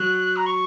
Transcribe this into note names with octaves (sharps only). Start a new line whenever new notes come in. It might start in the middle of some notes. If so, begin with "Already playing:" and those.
Already playing: F#3 F#6
A#5
C#6